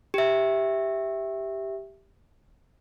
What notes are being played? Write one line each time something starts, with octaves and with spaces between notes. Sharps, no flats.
G4 E5